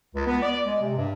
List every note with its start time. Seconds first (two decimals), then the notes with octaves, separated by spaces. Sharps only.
0.15 C#2
0.27 B3
0.43 D5
0.66 G#3
0.82 C3
0.97 G2